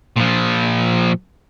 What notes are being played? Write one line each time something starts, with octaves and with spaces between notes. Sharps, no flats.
A#2 F3